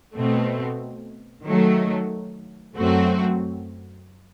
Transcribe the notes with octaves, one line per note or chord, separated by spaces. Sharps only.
B2 A3 C4
D#3 F#3 A3
F#2 F#3 A3 C4 F#4